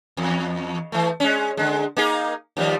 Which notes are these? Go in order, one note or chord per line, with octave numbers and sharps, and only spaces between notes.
E2
E3 A3
G#3 C#4
D3 G#3
A#3 D#4 G#4
D#2 F3 G3